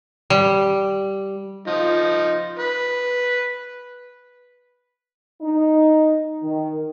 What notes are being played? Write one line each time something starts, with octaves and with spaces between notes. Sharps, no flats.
G3
F3 D#4
B4
D#4
D#3